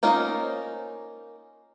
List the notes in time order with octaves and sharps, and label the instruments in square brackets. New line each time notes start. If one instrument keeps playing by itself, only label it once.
[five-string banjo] A#3 C#4 D#4 F4 C5